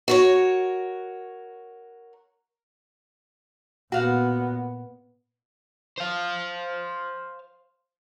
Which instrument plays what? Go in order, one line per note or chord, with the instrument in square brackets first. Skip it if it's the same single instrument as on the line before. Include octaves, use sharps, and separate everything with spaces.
[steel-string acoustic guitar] F#4 A#4 C#5
[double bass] A#2 B3 [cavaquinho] F#4 F5 F#5
[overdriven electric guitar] C5 F5